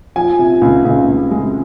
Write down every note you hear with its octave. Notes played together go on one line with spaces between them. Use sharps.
F3 G#5
C3
C#2
C#2
C#2
G#3